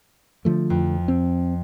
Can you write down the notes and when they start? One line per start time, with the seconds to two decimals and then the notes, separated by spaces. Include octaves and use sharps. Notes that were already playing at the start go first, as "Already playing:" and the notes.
0.45 D3 F3 A3
0.70 F2
1.08 C4